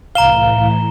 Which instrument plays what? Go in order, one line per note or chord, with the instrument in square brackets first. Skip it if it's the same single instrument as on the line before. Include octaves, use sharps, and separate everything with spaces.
[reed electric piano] C2 F5 [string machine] A2 E3 [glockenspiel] A#5 E7 G7